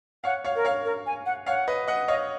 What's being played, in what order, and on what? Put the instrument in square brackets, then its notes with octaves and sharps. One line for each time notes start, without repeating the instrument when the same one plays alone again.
[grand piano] C#5 F5 [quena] F#5
[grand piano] C#5 F5
[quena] A#4
[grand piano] C#5 F5
[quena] A#4
G#5
F#5
[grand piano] C#5 F5 [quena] F#5
[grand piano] B4 D#5
D#5 F#5
[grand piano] C#5 F5 [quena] D#5